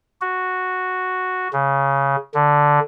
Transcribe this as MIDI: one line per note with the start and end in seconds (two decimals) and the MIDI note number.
0.21 1.48 66
1.53 2.16 49
2.34 2.80 50